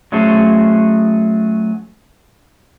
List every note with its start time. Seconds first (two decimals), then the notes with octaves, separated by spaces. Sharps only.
0.12 F#3 A3 C#4 G#4 A4 C5